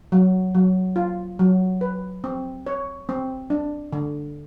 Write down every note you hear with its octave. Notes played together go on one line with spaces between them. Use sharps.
F#3
F#3
F4
F#3
B4
C4
C#5
C4
D4
D3